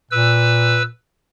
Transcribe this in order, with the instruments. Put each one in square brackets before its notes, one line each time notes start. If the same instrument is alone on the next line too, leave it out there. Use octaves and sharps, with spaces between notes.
[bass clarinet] A#2 [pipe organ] B4 E6